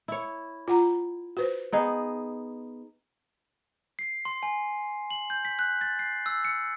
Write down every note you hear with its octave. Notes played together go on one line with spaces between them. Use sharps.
E4 C#5
F4 F#5 A#5
F#4 B4 C5
B3 D#4 G#4
C7
C6
G#5
F#7
G6
B6
F#6
A6
C7
E6
C#7